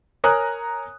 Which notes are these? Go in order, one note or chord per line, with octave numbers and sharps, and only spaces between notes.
A#4 C#5 G#5 A#5 D#6 F#6